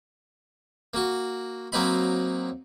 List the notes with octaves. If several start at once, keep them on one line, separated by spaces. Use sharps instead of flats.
A#3 F#4
F#3 A#3 C4 D#4 B5